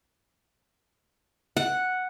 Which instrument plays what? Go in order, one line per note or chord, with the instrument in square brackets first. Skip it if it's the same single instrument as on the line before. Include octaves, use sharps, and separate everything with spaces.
[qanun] F#5